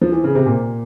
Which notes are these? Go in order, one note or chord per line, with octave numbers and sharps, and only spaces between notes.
F3
E3
C#3
C3
A#2